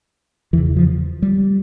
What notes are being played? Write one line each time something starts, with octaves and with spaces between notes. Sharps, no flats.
E2 C#3 E3
F3
G3